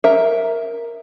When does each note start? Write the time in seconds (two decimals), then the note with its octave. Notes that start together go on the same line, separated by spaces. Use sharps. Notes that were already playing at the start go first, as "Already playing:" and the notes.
0.04 A#4 E5